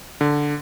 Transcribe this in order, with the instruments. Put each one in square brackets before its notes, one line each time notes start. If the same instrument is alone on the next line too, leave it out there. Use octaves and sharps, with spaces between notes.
[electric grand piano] D3